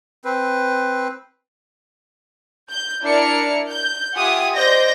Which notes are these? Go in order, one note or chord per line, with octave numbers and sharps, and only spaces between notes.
C4 B4
G6
D4 E4 A#4 D5 F6 C#7
G6
F4 G4 E5 F#5 G#5 D#6
C5 D5 D#5 G6 A#6